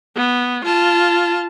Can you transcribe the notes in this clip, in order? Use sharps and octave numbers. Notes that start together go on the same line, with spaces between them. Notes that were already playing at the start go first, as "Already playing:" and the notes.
B3
F4 A5